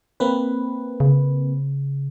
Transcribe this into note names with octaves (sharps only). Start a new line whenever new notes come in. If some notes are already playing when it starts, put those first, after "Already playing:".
A#3 C4 B4
C#3